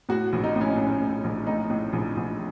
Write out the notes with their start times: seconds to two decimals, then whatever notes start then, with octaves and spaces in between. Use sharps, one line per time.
0.09 A2 F#4
0.33 A#1
0.44 D#4
0.56 A2
0.61 C#4
0.77 A2 C#4
1.02 A2
1.24 A#1
1.47 A2 D#4
1.70 A2
1.93 A#1
2.16 A#1